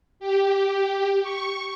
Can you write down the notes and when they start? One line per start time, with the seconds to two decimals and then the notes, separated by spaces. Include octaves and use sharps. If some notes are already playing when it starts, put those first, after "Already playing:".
0.20 G4
1.22 C#6